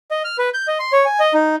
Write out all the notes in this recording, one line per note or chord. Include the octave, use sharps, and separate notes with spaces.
D#5
F6
B4
G6
D#5
C6
C#5
G#5
D#5
D#4